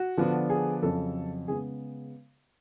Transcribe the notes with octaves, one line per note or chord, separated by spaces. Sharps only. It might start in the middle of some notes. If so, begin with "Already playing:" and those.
Already playing: F#4
D3 F3 B3 D4
G#4
F2 C#3 F#3 A4
C#3 G#3 B3 G#4